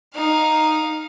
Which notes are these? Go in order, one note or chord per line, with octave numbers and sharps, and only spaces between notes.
D#4 F5